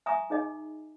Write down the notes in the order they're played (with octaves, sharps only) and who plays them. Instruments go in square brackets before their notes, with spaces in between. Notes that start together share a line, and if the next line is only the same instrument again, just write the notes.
[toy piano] E5 G#5 A#5 C#6 D#6
D#4 G#4 D#5